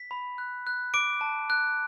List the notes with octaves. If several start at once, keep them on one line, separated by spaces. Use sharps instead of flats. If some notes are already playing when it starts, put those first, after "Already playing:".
Already playing: B6
B5
F#6
F#6
D6 D7
A5
F#6